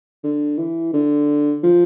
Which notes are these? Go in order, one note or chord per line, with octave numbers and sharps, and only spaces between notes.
D3
E3
D3
F3